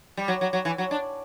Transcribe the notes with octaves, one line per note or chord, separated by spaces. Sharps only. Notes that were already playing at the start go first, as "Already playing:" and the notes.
G3
F#3
F#3
F#3
E3
F#3
D4